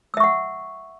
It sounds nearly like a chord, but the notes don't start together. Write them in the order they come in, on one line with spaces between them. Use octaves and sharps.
E6 E5 C#6 F#5